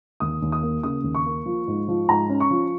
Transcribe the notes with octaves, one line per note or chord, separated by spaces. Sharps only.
D#2 D#6
D#2
D#6
A#3
C#3 D#6
D#2
C#6
A#3
F3
G#2
F3
G#2 A#5
C#4
C#6
F3